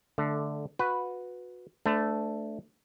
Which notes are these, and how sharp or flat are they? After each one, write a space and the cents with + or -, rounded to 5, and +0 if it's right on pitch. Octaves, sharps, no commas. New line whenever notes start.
D3 +0 A3 -10
F#4 -25 B4 +0
A3 +0 D4 +0 C5 -45